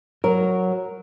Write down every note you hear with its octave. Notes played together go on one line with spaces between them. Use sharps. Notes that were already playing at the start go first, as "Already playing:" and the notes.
F#3 A#4